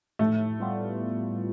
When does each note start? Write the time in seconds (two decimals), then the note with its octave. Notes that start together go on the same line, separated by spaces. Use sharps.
0.19 A2 A3
0.60 G3 B3 F4